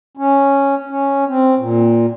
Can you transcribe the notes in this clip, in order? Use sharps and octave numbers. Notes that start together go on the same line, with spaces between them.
C#4
C#4
C4
A#2